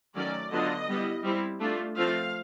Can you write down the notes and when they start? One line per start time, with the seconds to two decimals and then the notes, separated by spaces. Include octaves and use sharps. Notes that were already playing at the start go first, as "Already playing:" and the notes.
0.15 D#3 F#3 A3 C#4 D5
0.52 D3 F#3 B3 D4 F4 D#5
0.88 G3 B3 E4
1.24 G3 C4 E4
1.60 A3 D4 F4
1.96 F3 A3 C4 F4 F5